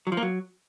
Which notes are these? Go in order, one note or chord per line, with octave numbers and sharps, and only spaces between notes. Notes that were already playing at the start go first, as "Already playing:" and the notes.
F#3
F3
A#3
F#3